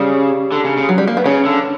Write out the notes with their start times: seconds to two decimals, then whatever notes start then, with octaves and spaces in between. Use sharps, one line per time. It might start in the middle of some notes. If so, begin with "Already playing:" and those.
Already playing: C#3 G3
0.52 D3
0.65 C#3
0.77 C#3
0.89 F#3
0.98 G3
1.08 A#3
1.17 B3
1.26 C#3 C#4
1.45 D3